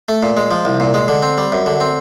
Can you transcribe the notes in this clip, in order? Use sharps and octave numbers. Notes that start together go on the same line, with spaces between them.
A3
A#2
G#3
F3
C2
A#2
G#3
D3
C4
G3
F#2
D3
C4